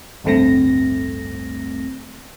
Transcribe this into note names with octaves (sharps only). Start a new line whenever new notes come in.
A1 D2 G2 A3 C4 A#6